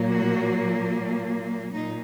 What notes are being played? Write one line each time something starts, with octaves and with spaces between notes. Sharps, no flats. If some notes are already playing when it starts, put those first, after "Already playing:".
Already playing: A#2 F#3 A#3
F#4
A#2 D#4